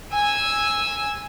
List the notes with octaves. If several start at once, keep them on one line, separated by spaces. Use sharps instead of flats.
G#5 E6